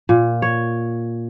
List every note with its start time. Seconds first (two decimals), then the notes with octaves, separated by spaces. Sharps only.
0.09 A#2
0.42 C#5